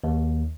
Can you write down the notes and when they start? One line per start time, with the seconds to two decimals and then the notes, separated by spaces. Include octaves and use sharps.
0.04 D#2